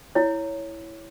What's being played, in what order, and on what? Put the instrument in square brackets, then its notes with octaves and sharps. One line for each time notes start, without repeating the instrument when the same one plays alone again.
[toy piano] E4 C#5